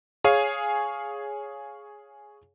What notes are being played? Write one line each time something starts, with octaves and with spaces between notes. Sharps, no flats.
G#4 C#5 F5 G#5